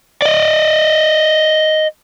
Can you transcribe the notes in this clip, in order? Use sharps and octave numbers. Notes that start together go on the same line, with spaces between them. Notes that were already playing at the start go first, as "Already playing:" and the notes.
D5 D#5